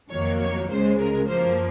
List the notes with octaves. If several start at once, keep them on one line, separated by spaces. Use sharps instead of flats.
F2 D#3 F#3 A#3 C#5
C#5
C#2 C#3 G#3 C5
A#4
F#2 F3 A#3 C5